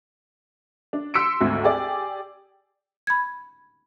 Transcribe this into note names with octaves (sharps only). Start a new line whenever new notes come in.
D4
C6 E6 B6 C#7 D7
G#1 D2
G4 G#4 D5
B5 G#6